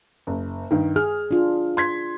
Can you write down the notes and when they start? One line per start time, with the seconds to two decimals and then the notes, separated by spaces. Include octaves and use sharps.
0.27 F#1
0.71 G2 D#3
0.96 G#4 F6
1.31 D4 F4
1.77 C6 G#6 B6